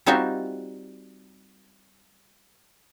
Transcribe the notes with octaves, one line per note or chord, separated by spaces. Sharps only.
G3 C4 D#4 F4 F#4 E5